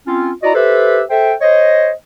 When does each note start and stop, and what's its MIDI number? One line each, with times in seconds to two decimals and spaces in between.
0.07 0.32 60
0.07 0.32 61
0.07 0.32 65
0.43 0.51 64
0.43 0.51 66
0.43 0.51 74
0.43 0.51 75
0.43 0.51 82
0.55 1.02 67
0.55 1.02 69
0.55 1.02 71
0.55 1.02 72
0.55 1.02 76
1.10 1.34 69
1.10 1.34 72
1.10 1.34 76
1.10 1.34 79
1.41 1.92 72
1.41 1.92 73
1.41 1.92 75